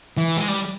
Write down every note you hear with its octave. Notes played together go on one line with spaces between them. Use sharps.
E3
G#3
G3